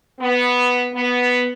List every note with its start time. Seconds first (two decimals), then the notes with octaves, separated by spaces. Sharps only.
0.20 B3
0.94 B3